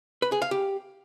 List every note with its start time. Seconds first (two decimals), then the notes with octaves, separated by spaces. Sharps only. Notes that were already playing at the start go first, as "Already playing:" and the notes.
0.22 B4
0.32 G#4
0.42 F5
0.51 G4